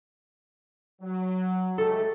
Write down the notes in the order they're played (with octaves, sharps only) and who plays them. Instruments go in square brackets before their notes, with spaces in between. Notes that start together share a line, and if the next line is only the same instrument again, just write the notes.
[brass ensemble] F#3
[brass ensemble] G#3 A3 G4 [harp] A4